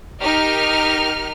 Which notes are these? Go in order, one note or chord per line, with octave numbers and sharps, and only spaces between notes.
D#4 G4 A#4 F6